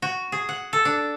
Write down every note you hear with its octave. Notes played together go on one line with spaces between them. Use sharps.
F#4
G#4
F#5
A4
D4